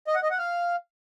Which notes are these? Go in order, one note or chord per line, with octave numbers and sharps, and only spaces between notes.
D#5
F#5
D#5
F#5
F5